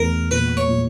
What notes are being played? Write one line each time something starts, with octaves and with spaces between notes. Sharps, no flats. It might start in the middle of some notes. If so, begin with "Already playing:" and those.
Already playing: E2 A3 A#4
A#2 B4
C#5
A#2